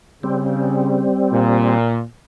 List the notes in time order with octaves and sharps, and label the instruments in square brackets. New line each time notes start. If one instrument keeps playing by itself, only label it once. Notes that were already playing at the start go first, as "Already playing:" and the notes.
[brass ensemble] C#3 [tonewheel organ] G3 C4
[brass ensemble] A#2